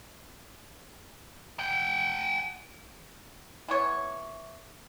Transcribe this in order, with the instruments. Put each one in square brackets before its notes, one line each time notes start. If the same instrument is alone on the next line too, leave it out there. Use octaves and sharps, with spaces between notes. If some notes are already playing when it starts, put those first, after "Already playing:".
[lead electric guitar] F#5 G5
[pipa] E3 B3 C#5